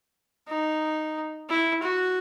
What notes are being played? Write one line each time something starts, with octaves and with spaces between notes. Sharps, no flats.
D#4
E4
F#4